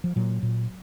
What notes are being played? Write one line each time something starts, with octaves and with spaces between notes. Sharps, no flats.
F3
A#2 F#3
A#2